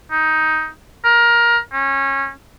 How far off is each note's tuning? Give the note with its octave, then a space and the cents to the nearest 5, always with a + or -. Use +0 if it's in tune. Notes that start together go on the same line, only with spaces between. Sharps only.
D#4 +10
A#4 +20
C#4 -20